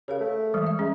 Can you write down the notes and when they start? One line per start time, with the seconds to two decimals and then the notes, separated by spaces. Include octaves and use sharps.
0.08 C#3 G4 A#4 F5
0.21 A3
0.54 E3 G3 G#3
0.67 E5
0.79 G#3 C#4